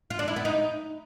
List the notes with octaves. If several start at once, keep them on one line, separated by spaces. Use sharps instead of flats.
F4
D4
E4
B3
D#4